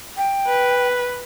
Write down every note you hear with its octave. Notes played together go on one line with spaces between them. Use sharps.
G5
B4